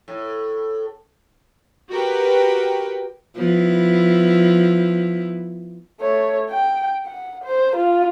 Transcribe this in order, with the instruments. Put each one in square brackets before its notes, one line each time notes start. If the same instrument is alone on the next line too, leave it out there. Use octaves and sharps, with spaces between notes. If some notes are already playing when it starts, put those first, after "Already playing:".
[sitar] A2
[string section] F#4 G4 A#4 B4 G5
[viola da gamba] F3 B3 E4
[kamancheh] A3 C#5
G5
F#5
C5
F4